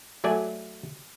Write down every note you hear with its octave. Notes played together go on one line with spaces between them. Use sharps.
F#3 A3 D5 G#5